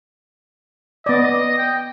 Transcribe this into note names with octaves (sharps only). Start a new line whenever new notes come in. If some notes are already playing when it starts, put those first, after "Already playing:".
B3 D5 D#5
G5